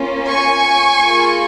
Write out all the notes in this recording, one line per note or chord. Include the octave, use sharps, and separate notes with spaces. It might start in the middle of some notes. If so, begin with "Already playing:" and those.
Already playing: A#3 C#4 F4
G#5 C#6
A#3 F4 G#4